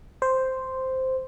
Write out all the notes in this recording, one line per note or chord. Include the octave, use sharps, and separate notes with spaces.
C5